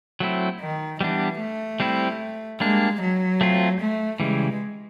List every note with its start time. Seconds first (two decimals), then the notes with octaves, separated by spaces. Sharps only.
0.20 F#3 A3 C4 E4
0.61 D#3
1.00 E3 G3 B3 D4
1.40 A3
1.80 G3 C4 E4
2.60 G3 G#3 A#3 D4
3.01 F#3
3.41 A3 C4 F4
3.80 A3
4.20 C#3 E3 G3 G#3